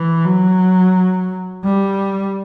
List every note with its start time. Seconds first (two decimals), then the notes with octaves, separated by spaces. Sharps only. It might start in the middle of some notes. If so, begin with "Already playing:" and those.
Already playing: E3
0.25 F#3
1.64 G3